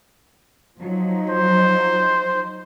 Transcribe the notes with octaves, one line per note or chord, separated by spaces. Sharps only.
F3 F#3 D#4
C5